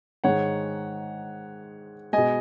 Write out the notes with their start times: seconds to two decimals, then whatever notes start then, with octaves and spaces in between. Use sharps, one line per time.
0.24 G#2 D#3 G#3 C#5 F#5
2.13 B2 G#3 D#5 G#5